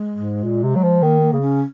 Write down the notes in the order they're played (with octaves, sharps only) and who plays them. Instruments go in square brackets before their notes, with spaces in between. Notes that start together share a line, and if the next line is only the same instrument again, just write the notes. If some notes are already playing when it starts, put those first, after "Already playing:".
Already playing: [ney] G#3
[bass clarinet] G#2
A#2
C3
F#3
F3
[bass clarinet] D#3 [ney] A#3
[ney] A#3
[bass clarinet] C#3
[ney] C#4